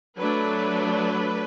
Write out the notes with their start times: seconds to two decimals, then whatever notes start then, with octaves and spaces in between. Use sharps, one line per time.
0.17 F#3 A3 D4 B4